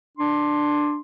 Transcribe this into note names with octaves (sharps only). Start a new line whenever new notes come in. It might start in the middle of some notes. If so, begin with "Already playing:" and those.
D4 C6